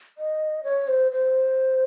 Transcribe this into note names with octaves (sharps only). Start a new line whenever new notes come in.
D#5
C#5
C5
C5